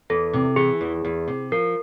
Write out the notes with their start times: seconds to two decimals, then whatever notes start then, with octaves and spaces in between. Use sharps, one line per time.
0.10 E2 A4
0.33 C3
0.56 E3 G#4
0.81 E2
1.05 E2
1.28 C3
1.52 F3 A#4